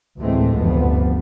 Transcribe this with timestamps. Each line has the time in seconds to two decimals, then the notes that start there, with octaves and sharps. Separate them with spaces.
0.20 D2 A2 E3 G#3 A3 C4
0.53 F1 D2 G2 F3 B3